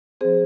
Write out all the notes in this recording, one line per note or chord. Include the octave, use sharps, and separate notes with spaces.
F3 C4 G#4 C5